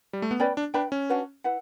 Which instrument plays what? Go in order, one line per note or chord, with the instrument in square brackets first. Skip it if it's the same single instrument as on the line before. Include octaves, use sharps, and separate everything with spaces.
[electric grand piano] G3
A3
B3
[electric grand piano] C#4 [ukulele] B4 D5 G5 B5
[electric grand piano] D4
[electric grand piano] D4 [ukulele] B4 E5 G5 B5
[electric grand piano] C#4
[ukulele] D4 F#4 B4 F#5
E4 B4 F#5